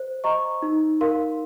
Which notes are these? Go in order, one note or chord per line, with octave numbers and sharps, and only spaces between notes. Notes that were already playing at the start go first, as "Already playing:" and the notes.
Already playing: C5
D#5 A#5 C#6
D#4
A#4 F5 C6